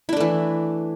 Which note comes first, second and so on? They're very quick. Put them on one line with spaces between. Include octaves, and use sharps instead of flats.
E4 D4 A3 E3